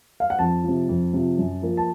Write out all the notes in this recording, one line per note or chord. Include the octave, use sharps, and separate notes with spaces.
F5
F#5
F2 A5
C3 F3
F2
C3 F3
F#2
F3 A#3
A5